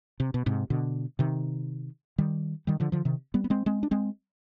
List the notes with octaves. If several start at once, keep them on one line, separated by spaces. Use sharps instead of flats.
C3
B2
G#2 C3
B2 D3
C3 D#3
D#3 G3
D#3 G3
D3 F3
D3 F3
C3 D#3
G3 B3
B3
G#3 C4
G#3 C4
D4
G#3 C4